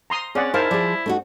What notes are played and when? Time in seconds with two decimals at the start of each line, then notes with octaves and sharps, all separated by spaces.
0.10 A#5 C6 D#6
0.35 C4 C#4 G#4 D5 F#5
0.54 D#4 E4 A#4 C5 F5 A5
0.71 F3 G#4 D5
1.06 A3 D#4 F#4